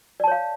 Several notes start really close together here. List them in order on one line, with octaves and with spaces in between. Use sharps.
D5 A5 C#5 F5